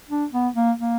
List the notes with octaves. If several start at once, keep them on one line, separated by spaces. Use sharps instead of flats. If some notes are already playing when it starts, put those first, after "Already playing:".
D4
B3
A#3
A#3